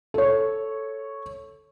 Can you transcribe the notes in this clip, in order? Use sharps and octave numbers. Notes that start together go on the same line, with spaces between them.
A4 C#5